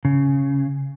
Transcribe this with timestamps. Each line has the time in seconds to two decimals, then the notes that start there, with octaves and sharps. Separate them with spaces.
0.05 C#3